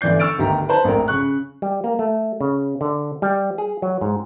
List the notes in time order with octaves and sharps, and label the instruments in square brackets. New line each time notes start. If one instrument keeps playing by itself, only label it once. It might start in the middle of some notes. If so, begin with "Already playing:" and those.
[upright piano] G1 D3 E3 D5 G6 C7
C#6 E6 F6 A6 D7
G1 D2 D#3 G4 A#5
B4 C5 A5
A#1 F2 A2 A#4
C#3 C#6 F#6
[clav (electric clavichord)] G3
A#3
A3
C#3
D3
G3
G#4
F#3
G#2